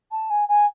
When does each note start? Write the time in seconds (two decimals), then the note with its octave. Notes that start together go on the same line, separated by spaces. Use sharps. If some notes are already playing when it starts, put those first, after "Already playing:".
0.11 A5
0.30 G#5
0.48 G#5